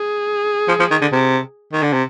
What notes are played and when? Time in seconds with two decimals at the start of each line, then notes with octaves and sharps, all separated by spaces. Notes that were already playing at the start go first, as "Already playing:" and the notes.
Already playing: G#4
0.68 F3
0.80 F3
0.91 D#3
1.02 D3
1.12 C3
1.73 D#3
1.83 D3
1.93 C3